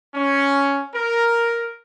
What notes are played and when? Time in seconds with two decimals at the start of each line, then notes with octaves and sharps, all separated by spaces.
0.15 C#4
0.94 A#4